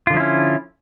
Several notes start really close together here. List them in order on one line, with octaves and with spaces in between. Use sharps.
F4 D3 F3 E4 C#4